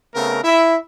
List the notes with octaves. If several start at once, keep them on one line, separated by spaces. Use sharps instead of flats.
C#3 A3 B3 C4 A#4
E4 E5